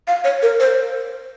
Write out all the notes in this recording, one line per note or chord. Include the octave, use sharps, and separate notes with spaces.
F5
C#5
A#4
C5